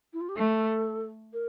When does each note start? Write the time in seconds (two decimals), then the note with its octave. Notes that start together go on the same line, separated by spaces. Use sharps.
0.13 E4
0.21 F4
0.29 G4
0.36 A3 A4
1.33 A#4